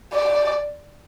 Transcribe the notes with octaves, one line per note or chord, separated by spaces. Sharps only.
D5